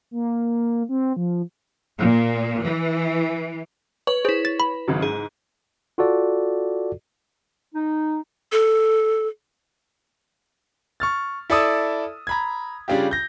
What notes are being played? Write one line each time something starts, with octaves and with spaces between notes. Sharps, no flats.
A#3
C4
F3
A#2
E3
B4 C#5
E4 G#4 B4 C5
A6
B5
G#1 C#3 F#3
G#2 G#4
F4 F#4 A4 D5
D#4
A4
C#6 F6 A6
E4 A4 D5 A5 D#6 E6
A#5 B5 G#6
C#3 G3 D4 F4 G4
G6 A#6